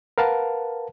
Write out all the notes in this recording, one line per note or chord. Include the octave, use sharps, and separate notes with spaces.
A#4 B4 F5 F#5 A5